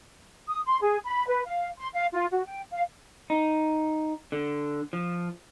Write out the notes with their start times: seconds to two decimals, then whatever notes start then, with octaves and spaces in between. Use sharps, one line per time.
0.47 D#6
0.66 C6
0.82 G#4
1.05 B5
1.27 B4
1.46 F5
1.79 C6
1.94 F5
2.14 F4
2.32 F#4
2.46 G5
2.71 F5
3.30 D#4
4.32 D3
4.93 F3